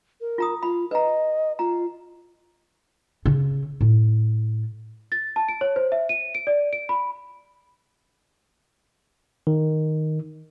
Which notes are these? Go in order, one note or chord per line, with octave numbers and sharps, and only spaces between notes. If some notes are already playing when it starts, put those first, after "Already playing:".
A#4
F4 A#5 D#6
F4 B5
B4 D#5 A#5
F4 A#5
C#3 C#4
A2
A6
A5
D7
C#5
C5
E5
D#7
D7
D5
D7
B5
D#3